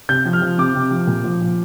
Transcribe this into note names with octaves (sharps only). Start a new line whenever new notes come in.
C3 G6
F3
F6
F3
C3 D6
C3
F3
A#2
F3
F3